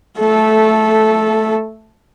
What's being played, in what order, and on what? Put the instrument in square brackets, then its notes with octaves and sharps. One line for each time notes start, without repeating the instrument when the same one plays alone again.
[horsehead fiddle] A3 A4